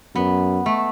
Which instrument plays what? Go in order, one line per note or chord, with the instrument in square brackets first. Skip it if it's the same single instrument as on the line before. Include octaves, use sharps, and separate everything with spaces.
[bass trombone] F#2 [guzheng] B3
[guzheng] A3